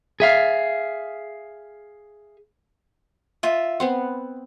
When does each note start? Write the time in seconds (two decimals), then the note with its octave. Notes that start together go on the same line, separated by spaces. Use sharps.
0.20 G#4 E5 F5
3.43 F4 D#5 E5
3.80 B3 C4 F#5 C6